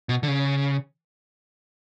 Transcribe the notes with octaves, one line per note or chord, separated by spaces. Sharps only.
B2
D3
C#3